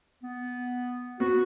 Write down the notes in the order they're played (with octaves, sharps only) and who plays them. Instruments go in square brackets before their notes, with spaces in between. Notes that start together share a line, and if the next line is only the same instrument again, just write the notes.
[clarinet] B3
[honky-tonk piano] B3 [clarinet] F#4